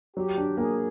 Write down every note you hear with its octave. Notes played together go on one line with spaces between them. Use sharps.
F#3 G4
D4
A#3 G#4